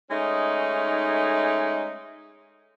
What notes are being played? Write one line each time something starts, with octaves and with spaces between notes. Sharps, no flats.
G#3 A3 C#4 D#4